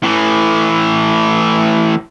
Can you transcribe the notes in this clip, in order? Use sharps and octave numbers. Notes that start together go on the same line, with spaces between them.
A2 E3